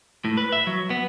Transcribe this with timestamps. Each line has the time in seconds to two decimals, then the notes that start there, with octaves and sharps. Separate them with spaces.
0.25 A2
0.37 B4
0.52 E5
0.67 F#3
0.90 B3